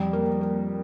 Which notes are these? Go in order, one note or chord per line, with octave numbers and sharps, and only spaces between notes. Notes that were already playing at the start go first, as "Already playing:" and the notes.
Already playing: F2 G3
A#3
A#3